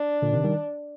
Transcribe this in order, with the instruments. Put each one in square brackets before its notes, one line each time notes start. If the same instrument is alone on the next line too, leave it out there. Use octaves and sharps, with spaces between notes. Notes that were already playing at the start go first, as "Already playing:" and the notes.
Already playing: [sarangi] D4
[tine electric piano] A#2 D3
C3 D#3
D#3 G3